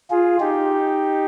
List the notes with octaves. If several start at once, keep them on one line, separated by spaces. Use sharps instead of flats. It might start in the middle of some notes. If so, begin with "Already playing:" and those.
F4 G#4
D#4 G4